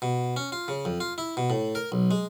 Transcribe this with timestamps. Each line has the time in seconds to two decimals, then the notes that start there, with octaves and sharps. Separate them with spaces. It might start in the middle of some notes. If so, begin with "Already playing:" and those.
0.02 B2
0.37 C#4
0.52 F4
0.68 C#3
0.85 F2
1.00 F4
1.18 E4
1.37 B2
1.50 A2
1.75 A#4
1.92 B1
2.11 G#3